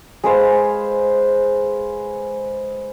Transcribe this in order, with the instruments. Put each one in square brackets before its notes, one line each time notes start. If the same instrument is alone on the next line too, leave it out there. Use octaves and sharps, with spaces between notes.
[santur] G#3 B4 C5 F5